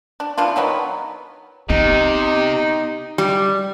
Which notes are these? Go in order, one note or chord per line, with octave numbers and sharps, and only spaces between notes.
D4
E3 F3 D4 F4
B2 D#3 F#3 B3
C3 B3 D#4 G4
G3